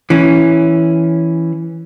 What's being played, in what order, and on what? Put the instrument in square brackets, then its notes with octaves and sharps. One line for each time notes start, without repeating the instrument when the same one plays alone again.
[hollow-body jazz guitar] E3 C#4